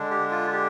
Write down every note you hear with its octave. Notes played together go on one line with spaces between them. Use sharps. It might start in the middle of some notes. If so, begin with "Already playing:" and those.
Already playing: D3 G#3 D4
G4
F4
G4